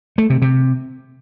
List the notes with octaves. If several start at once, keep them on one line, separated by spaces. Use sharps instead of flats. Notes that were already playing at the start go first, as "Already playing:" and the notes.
A3
C3
C3